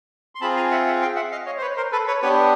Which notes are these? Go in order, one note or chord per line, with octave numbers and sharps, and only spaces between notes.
C6
C4 F4 G#4 A5 B5
G#5 A#5
E5 F#5
E5 F#5
F5 G5
E5 F#5
D#5 F5
C#5 D#5
C5
B4 C#5
A#4 C5
A4 B4
B4 C#5
B3 D4 G4 B4 C#5